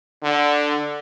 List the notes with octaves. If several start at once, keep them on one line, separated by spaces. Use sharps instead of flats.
D3